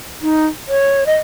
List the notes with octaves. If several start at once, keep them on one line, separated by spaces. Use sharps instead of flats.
D#4
C#5
D#5